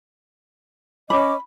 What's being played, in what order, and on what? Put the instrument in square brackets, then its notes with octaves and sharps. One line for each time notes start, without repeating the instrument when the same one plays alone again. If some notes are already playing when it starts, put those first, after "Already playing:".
[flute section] C#4 D#5 D6 [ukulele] B5